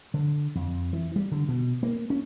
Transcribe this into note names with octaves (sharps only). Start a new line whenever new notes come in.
D3
F2
E3
G3
D3
B2
A#3
C#4